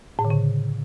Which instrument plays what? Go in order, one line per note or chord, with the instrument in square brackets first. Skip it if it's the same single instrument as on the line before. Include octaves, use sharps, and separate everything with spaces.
[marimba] A2
D3
C#3